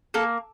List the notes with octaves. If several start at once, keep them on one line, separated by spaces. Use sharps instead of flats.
A#3 A4